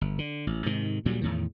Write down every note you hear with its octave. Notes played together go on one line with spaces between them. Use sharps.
G1
D3
A1
G#2 C3 D#3
D2 A#2 F#3 G3
E2 A2 D#3